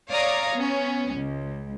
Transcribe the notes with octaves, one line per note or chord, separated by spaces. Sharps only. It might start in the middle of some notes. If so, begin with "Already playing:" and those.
C#5 D5 F5 A#5 D#6
B3 C#4
C#2